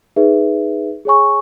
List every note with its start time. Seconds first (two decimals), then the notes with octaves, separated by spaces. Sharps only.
0.16 D#4 G#4 B4 E5
1.05 G#4 C#5 G#5 C#6